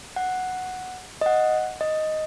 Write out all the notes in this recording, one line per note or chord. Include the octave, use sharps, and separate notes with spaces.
F#5
D#5
F#5
D#5